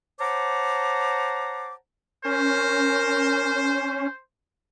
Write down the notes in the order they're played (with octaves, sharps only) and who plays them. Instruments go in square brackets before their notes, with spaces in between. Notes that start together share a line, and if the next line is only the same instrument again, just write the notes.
[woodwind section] C5 C#5 F#5 A5 A#5 D6
[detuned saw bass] C#4 [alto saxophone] A#4 [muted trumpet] C5